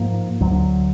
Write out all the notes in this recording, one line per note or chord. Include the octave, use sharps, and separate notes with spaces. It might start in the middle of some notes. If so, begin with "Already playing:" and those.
Already playing: G#2 F3 A#3
D2 D3 F#3